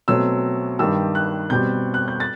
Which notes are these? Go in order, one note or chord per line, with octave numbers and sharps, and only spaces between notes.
B2 F#3 A3 C4 E6
G2 D#3 G3 E6
F#6
B2 G3 C4 G6
F#6
G6
A6